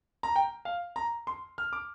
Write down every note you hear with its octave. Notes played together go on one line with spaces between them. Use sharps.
A#5
G5
F5
A#5
C6
F6
D6